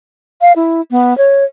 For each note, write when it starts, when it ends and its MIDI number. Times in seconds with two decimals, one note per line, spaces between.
0.41 0.53 77
0.56 0.81 64
0.91 1.16 59
1.18 1.44 73